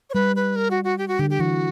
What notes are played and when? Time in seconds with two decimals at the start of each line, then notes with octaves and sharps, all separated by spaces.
0.10 C#5
0.14 G3 B4
0.36 B4
0.56 A#4
0.71 F#4
0.84 F#4
0.98 G4
1.08 F#4
1.19 D3 G4
1.30 G4
1.39 E3 F#4